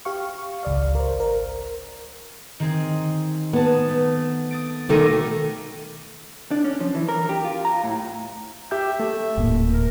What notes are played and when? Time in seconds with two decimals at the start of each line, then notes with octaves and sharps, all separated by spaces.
0.05 G4 F5 C#6
0.63 G#1 C#2 D5 F5
0.95 A#4 C5
1.20 A#4
2.60 D#3 C4 G#4
3.53 B3 G#4 A5
3.89 A3
4.51 D#6 A6 D7
4.89 B2 D#3 A3 D6 A#6 D#7
6.51 D4
6.64 C#4
6.80 F3
6.95 E3
7.08 A#4
7.29 G4
7.44 F4
7.65 A#5
7.84 A2
8.71 G4 E5 G5 G6
9.00 A3
9.38 D#1 A2 A#3
9.73 A#4